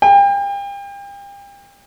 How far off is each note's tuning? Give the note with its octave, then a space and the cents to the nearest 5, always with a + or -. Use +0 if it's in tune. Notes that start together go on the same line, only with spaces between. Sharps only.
G5 +35